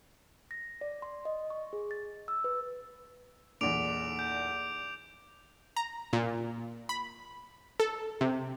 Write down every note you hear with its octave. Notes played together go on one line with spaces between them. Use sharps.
A#6
D5
C6
D#5
C#6
G#4
A6
E6
B4
B1 E2 A#2 D6 D7 F7
G6
A#5
A#2
B5
A4
C3